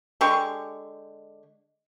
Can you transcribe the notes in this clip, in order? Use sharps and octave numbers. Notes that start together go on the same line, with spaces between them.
D3 G#3 G4 C#6